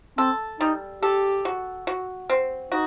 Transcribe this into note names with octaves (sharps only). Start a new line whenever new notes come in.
C4 A4
G3 D#4
G4 A4
F#4
F#4
C4
D#4 F#4